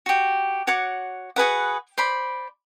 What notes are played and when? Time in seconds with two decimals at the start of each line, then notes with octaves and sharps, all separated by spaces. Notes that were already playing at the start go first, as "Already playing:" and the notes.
0.06 F#4 G4
0.67 F#4 C#5 F#5 D6
1.36 F#4 G#4 B4 F#5
1.98 C5 D5 B5